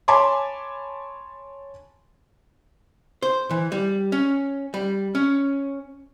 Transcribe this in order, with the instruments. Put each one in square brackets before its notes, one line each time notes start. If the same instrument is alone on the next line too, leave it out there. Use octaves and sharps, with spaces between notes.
[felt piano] C#5 G#5 A5 B5 C6 D6
[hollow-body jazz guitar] C5
E3
G3
C#4
G3
C#4